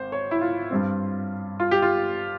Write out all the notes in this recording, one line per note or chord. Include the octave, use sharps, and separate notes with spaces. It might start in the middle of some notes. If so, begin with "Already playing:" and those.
Already playing: G#1 C5
C#5
E4
F4
G2 G3 C4
F4
G4
F4